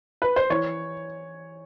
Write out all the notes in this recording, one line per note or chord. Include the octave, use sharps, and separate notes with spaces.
B4
C5
E3 C#5